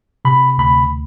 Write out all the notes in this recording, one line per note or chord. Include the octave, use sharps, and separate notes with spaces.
C3 B5
D2 B5